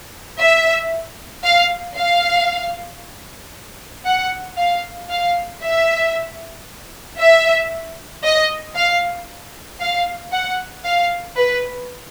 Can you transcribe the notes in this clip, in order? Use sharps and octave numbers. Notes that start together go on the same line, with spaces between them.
E5
F5
F5
F#5
F5
F5
E5
E5
D#5
F5
F5
F#5
F5
B4